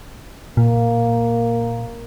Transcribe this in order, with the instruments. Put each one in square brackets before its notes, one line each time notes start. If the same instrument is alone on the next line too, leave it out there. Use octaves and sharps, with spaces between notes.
[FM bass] A#2 [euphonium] A#3